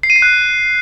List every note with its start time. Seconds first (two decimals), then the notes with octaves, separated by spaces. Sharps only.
0.03 C7
0.10 D#7
0.16 C7
0.22 F#6